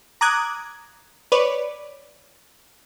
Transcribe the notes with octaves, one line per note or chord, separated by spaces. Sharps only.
A#5 D6 D#6 F#6 G#6
B4 C#5 D5